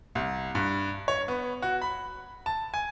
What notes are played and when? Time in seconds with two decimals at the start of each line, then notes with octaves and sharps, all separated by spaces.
0.15 C2
0.55 G2
1.08 C#5
1.28 B3
1.62 F#4
1.82 B5
2.46 A5
2.74 G#5